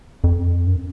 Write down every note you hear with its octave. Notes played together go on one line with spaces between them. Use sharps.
F2
F#2